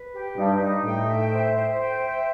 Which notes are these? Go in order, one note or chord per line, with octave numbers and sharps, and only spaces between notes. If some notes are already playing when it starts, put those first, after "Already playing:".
Already playing: B4
G4
G2 D#4
D#4
A2 G5
E5
C5
C5
G5
E5